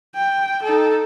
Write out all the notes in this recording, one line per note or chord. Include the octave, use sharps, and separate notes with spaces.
G5
D#4 A4